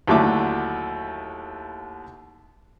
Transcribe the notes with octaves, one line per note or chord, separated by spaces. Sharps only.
D#2 D3 F#3 A3 E4 D6